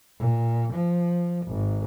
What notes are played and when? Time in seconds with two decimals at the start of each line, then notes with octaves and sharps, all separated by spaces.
0.19 A#2
0.73 F3
1.46 G#1